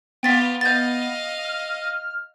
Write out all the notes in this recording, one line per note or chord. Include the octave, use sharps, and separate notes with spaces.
B3 F4 G4 G5 A6 B6
D#5 F5 G6 A6
F6